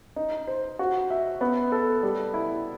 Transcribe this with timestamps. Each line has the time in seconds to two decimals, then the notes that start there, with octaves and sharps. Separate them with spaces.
0.16 D#4
0.47 C5
0.79 F#4
1.10 E5
1.41 B3
1.72 A4
2.03 G3
2.34 E4